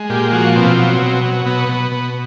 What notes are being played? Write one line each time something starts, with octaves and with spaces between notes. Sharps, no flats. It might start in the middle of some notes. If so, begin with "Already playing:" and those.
Already playing: G#3
A#2 G4
F3 F#4
B2 C4
F#3
B2
F#3
B2 B3
B2
B2